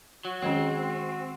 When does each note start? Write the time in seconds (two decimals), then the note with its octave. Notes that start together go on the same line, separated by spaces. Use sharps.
0.25 F#3 F#4
0.42 D#3 G#3 C4 C#4 G#4 D#5 G5